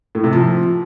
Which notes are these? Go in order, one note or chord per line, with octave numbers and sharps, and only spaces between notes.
A2
C3
F3